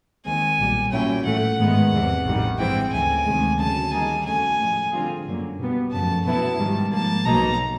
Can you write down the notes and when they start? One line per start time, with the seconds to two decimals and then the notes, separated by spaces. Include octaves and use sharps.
0.25 D#2 D#3 G#3 C4 G#5
0.59 B1 A#2 G3
0.92 A#2 F#3 A#3 C#4 E4 G5
1.25 A2 E3 A3 F#5
1.59 G#2 D#3 G#3 B3
1.92 E2 C3 E3
2.25 A1 G2 D#3 G3
2.58 G#2 E3 G#3 C4 E4 G5
2.92 D2 C#3 E3 G#5
3.25 D2 C3 D#3 G#3
3.59 D2 C#3 F#3 A5
3.91 D#3 G3 A#3 D#4 G#4 G#5
4.25 E2 C#3 F#3 A3 G#5
4.59 A2 F3 G#3
4.92 D3 G3 C4 F4 G#4
5.26 F#2 D3 F#3 A#3
5.59 B2 G3 B3
5.91 F#2 C#3 F3 A3 A5
6.25 B2 F#3 B3 E4 A5
6.58 G#2 D#3 G3
6.91 G#2 F3 A#3 A5
7.25 B1 B2 F#3 A#3 D#4 A#5